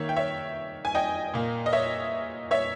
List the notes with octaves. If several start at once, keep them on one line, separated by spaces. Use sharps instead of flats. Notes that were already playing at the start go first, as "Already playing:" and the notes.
Already playing: D#3 A#3 C#5 E5
G5
C#5 E5
G#5
D#5 G5
A#2 A#3
D#5
C#5 E5
C#5 E5